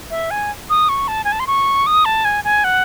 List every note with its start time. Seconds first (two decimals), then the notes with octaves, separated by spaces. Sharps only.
0.11 E5
0.31 G#5
0.70 D#6
0.89 C#6
1.08 A5
1.24 G#5
1.32 A5
1.40 C6
1.47 C#6
1.87 D#6
2.05 A5
2.25 G#5
2.44 G#5
2.64 F#5